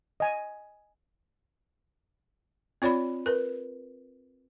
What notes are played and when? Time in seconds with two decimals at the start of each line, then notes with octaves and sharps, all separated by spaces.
0.20 D#5 G#5
2.82 C4 F4 C#5 D5 B5
3.26 A#4 B4